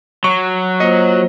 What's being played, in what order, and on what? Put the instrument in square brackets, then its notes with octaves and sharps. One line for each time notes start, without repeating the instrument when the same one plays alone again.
[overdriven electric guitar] F#3 [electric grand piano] C#6
[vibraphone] A#3 F4 C5 [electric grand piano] D#5